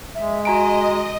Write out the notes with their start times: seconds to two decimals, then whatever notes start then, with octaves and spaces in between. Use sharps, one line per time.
0.15 G#3 E5
0.45 F#4 D#5 G#5 A#5 D7